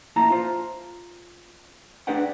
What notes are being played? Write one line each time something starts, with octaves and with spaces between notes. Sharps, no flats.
A#2 E4 A5 A#5
F4 C5
D4 G#4 B4 D5 F#5 G5